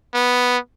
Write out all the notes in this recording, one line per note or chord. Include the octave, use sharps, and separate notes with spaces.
B3